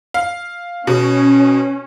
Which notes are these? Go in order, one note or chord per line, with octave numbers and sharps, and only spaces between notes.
F5
B2 C#4